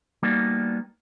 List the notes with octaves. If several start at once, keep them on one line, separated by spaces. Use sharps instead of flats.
G3 A#3 B3 D4 D#4 F#4